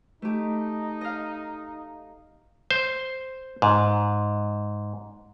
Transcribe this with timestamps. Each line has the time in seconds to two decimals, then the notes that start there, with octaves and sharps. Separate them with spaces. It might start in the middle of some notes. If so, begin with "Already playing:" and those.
0.22 A3 D#4 G4
1.01 D#5 F5
2.71 C5
3.62 G#2